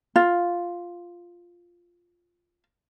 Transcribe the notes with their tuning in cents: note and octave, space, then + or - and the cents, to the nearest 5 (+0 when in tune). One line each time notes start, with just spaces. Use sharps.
F4 +0